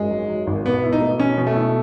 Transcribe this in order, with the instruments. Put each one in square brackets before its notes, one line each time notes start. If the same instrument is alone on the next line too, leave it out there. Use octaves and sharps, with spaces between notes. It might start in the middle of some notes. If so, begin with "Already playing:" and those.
Already playing: [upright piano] G#1 F#2 F#3 [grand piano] G#3
[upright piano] F#3
F#3
G#1
[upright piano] B2 [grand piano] B3
[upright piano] E4
[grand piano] D#4
[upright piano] A3
[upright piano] B2 [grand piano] C#4
[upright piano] B2
[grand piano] A3
[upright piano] E4